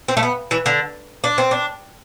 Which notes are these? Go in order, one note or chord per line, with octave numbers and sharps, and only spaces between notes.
C4
A3
B3
E3
D3
D4
C4
D4